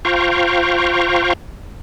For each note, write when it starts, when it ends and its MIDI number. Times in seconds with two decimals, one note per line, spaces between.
0.05 1.33 65
0.05 1.33 72
0.05 1.33 77
0.05 1.33 79
0.05 1.33 82
0.05 1.33 85